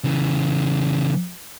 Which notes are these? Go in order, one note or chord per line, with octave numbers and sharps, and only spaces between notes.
C#3 E3